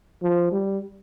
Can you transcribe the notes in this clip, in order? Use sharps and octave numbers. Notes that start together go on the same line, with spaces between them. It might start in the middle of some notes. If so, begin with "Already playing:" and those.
F3
G3